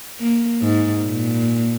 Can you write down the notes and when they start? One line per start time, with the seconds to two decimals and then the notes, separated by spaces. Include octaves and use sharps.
0.20 A#3
0.62 G#2
1.03 A#2